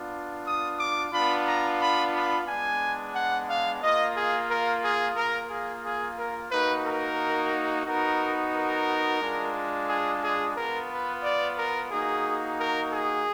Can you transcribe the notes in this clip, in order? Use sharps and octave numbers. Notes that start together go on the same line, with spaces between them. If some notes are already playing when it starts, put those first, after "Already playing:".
Already playing: B3 D4 F4
D#6
D6
B3 D4 F4 B5
A#5
B5
B5
G#3 B3 D4 G#5
F#5
F5
A#3 F4 D#5
G#4
A#4
G#4
A#3 F4 A#4
G#4
G#4
A#4
A#3 D#4 F#4 B4
A#4
B3 D#4 F#4 A#4
A#4
G#3 D4 F4
G#4
G#4
B3 F4 A#4
B4
D5
A#4
A#3 D#4 F#4 G#4
A#4
G#4